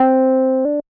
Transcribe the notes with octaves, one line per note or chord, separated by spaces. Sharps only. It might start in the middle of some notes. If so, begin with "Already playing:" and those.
Already playing: C4
D4